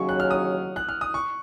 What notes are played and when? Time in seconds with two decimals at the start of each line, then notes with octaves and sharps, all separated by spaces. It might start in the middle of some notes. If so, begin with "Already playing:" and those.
Already playing: D#2 C#3 F#3 C#6
0.09 F#6
0.20 F6
0.31 D#6
0.76 F#6
0.89 F6
1.01 D#6
1.14 C#6